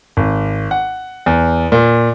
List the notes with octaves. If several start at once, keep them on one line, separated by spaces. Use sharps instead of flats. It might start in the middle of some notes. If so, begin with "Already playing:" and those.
G#1
F#5
E2
A#2